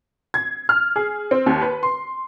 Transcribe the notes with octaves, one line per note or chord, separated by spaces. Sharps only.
G#6
F6
G#4
C4
D#2
B4
C6